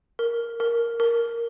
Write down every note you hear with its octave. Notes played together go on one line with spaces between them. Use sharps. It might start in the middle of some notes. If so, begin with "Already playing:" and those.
A#4
A#4
A#4